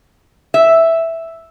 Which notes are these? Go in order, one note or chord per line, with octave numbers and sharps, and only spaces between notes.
E5